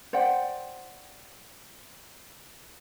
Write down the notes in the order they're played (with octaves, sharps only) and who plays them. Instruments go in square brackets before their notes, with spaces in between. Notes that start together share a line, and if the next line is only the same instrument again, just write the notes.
[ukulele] C5 D5 F#5 G5